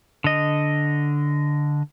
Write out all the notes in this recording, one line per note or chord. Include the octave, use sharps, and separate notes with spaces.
D3 D#5